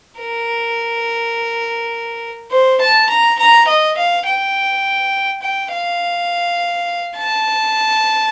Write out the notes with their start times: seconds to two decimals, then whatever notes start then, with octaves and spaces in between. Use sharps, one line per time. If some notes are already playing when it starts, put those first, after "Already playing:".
0.19 A#4
2.52 C5
2.81 A5
3.10 A#5
3.39 A#5
3.68 D#5
3.97 F5
4.26 G5
5.42 G5
5.72 F5
7.17 A5